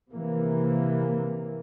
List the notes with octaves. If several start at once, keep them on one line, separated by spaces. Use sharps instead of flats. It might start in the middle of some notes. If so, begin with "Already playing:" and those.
C3 E3 A#3